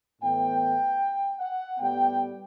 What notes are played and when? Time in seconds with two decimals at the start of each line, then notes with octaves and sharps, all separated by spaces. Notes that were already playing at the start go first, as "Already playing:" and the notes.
0.21 A2 E3 B3 G5
1.39 F#5
1.79 A2 G3 B3 G5